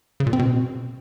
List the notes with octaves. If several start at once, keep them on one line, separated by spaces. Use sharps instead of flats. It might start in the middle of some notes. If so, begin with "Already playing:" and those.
C#3
A#2
C4
B2